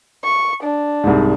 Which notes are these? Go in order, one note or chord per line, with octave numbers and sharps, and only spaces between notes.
C#6
D4
C2 G#2